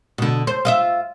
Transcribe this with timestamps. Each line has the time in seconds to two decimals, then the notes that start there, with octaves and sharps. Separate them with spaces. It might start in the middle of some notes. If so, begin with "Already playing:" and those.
0.18 B2 D3
0.47 C5
0.65 F4 D#5 E5